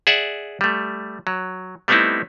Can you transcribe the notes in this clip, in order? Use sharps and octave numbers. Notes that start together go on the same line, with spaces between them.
G#4 D5 E5 F#5
G3 A3
F#3
G3 A3 B3 C4 D#4 E4